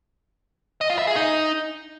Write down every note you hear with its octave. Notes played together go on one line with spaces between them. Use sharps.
D#5
F4
E5
G#4
D#4